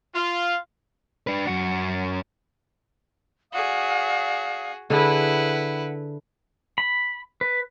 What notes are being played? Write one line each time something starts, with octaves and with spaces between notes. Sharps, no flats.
F4
D4 B4
F#2 F#4
F#4 G#4 D5 F5 D#6
D3 E4 G#4 B4 F#5
B5
B4